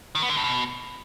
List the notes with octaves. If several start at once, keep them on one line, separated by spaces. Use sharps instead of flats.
D#3
B3
D3
G2
B2